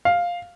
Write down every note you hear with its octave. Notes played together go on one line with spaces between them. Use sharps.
F5